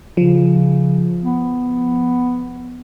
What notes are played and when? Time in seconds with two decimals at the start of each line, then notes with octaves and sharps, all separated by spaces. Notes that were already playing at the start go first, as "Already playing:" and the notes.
0.17 C#3 F3
1.22 B3